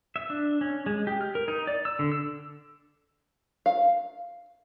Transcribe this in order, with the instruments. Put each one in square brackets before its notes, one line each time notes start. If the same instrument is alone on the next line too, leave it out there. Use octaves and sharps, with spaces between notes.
[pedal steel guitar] E5
D4
C#4
G#3
G4
F6
A#4
D#4
D5
E6
D3
E6
[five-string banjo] F5